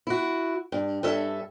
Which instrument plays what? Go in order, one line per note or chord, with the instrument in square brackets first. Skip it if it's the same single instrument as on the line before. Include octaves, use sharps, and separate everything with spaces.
[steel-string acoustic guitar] E4 F#4
G2
G2 C#4 A4 E5